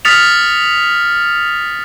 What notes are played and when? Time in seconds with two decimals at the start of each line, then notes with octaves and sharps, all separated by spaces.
0.05 D#6 F6 A6 B6 C#7 F7